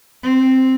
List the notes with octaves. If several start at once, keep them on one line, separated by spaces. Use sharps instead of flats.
C4